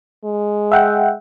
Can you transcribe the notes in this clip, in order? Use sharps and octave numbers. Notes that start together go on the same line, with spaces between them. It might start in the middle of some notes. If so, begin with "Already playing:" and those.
G#3
E5 F#5 G5